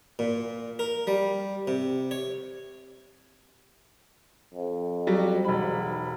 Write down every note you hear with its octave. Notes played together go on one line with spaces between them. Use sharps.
A#2
A#4
G3
C3
C#5
F2
F#3 G3
E1 G#2 B5